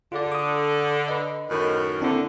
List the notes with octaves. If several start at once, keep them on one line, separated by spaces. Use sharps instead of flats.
D3 F4 G#4 D5
D6 D#6
B4 D#5
F#2 A2 D#3
A#2 D3 C4 D4 E4